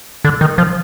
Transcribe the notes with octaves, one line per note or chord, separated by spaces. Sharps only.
D3
D#3
F3